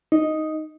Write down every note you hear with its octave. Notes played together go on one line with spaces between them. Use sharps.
D#4